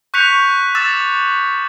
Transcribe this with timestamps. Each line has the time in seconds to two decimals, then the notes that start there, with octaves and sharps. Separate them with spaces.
0.14 C#6 F#6 G6 B6 C#7 F7
0.75 D6 E6 A6 E7